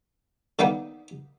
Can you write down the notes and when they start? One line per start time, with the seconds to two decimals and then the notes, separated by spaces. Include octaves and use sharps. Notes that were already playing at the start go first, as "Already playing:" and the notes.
0.59 D3 D#3 A#3 B3 D4 D#4